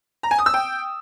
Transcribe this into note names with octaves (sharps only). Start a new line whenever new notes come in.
A#5
G#5
D#6
E6
G5